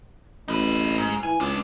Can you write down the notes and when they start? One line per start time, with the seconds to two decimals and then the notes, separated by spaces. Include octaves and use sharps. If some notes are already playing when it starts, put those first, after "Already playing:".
0.48 A1 D#4 B4
0.98 G#2
1.23 E3 G#5
1.40 C#2 G#3 D4